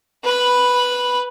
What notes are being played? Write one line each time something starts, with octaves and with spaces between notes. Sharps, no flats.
B4 B5